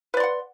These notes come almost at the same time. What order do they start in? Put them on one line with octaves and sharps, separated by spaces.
B4 D5 C6 F#5